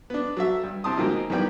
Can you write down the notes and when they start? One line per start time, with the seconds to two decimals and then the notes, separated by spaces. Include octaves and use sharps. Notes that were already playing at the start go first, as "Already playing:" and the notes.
0.10 B3 D4
0.37 F#3 A4 E5
0.63 G2
0.84 C3 E3 C4 A5 C6 D#6
0.98 B2 D#3 F3 G#3 A#3 C4
1.30 F#2 D#3 E3 G3 B3 G5